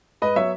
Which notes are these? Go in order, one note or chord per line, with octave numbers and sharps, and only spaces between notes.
G#2 B4 D#5
F#3 B3 C#5 E5